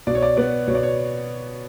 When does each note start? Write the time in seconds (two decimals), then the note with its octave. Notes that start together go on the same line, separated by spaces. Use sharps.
0.07 B2 D5
0.15 C#5
0.22 D5
0.37 B3 D5
0.67 B2 C#5
0.75 D5
0.83 C#5